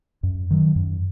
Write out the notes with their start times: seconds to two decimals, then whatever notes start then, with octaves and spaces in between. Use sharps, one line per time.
0.23 F#2
0.51 D#3 F#3
0.76 F#2